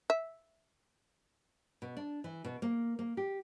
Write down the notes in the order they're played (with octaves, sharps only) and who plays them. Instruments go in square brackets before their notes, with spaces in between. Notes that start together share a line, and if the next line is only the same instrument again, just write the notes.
[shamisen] E5
[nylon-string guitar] B2
D4
E3
B2
A#3
A#3
G4